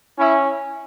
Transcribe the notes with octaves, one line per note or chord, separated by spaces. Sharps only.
C#4 E4